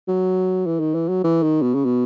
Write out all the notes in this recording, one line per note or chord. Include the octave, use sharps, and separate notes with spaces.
F#3
E3
D#3
E3
F#3
E3
D#3
B2
C#3
B2